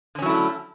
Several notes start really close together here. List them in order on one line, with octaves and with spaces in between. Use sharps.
D3 C#4 F#3 E4 A3